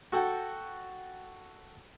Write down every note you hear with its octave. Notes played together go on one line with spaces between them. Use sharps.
F#4 A4 F#5 G5